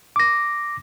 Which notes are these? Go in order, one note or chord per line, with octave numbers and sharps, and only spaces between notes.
D6 A#6